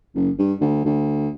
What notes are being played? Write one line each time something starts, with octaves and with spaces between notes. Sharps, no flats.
F#1
G2
D2
D2